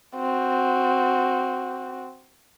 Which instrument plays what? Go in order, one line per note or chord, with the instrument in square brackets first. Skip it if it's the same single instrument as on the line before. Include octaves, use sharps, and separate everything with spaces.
[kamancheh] C4 F#4